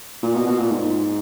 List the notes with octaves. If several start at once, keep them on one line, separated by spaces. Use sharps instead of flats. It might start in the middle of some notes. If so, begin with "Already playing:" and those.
A#2
B2
B2
A#2
G#2